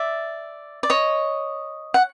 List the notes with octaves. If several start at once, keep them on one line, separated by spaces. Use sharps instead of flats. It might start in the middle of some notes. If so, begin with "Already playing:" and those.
Already playing: D5 E5
D5
C#5 D#5
F#5